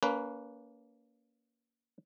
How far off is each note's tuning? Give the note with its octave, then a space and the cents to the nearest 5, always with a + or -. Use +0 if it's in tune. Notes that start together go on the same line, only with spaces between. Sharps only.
A#3 +0 C#4 +35 B4 +0